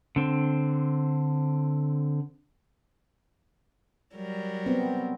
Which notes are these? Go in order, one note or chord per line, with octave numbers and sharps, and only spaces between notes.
D3 C4
F#3 G3 A#4
B3 C4